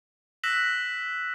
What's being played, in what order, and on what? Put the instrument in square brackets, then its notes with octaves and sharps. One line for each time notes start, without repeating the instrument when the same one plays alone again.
[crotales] E6 F#6 A#6 B6 E7 F#7